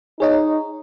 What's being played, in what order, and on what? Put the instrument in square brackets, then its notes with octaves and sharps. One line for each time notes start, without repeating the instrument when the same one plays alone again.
[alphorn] D#4 [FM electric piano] G#4 C#5 D#5